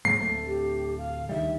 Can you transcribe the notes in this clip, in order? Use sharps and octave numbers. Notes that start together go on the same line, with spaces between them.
G#2 F#3 A#3 C7
D1 D2 A3
G4
F5
D2 D#3 G3 E5